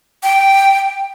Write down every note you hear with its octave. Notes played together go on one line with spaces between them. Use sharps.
G5